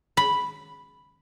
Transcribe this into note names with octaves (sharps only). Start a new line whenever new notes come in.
B5